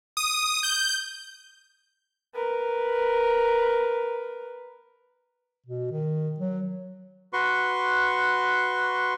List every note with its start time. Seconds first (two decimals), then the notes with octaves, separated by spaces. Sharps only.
0.17 D#6
0.63 G6
2.35 A#4 B4
5.67 B2
5.92 D#3
6.40 F#3
7.33 F#4 B4 C6 C#6